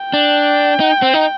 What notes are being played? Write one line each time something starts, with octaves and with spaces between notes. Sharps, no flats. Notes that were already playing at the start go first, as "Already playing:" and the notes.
Already playing: G5
D4
D#4
C4
D#4